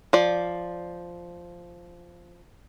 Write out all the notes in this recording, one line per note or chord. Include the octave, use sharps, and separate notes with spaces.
F3 D5